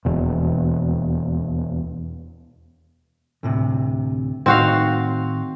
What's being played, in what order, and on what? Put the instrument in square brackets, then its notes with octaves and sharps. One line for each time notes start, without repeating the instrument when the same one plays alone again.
[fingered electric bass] D#1 E2 B2
[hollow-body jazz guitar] D2 A2 C3
[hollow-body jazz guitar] A2 D#3 D#4 [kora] C4 F#4 F5